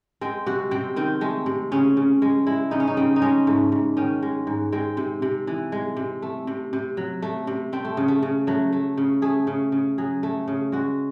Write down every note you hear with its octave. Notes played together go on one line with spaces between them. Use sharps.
G#3 C4
C3 F#4
C3 C4
D#3 C4
G#3 A3
C3
C#3 C#4
C#3
G#3
G#3 E4
C#3 D#4
C#4
D#4
C#3 C4
D#4
G#3 C#4
G#2 A3
G#2
D#3 C#4
G#3
G#2
G#3 C4
C3
C3
E3
G#3
C3
A3
C3
C3
F#3
A3
C3
A3 C4
A3
C#3
A3
C#3
F#3 A3
A3
C#3
A3 G#4
C#3
C#3
F#3 G#4
A3
C#3
G#3 F#4